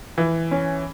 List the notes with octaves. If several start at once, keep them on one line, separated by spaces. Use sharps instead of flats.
E3
C#4